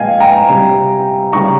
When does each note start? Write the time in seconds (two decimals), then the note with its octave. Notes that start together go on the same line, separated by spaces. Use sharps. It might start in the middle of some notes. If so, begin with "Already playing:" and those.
Already playing: A#2 F3 G#3 D#5 F5 G5 G#5
0.20 G5 A#5
0.49 C3 G3
1.32 C#3 G3 A#5 C#6